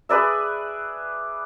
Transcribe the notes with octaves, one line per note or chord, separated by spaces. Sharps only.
G#4 B4 D5 E5